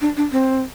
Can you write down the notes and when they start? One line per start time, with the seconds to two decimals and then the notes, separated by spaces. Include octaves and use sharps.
0.01 D4
0.16 D4
0.32 C4